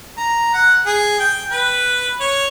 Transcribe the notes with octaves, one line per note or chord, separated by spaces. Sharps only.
A#5
F#5
G#4
G5
B4
C#5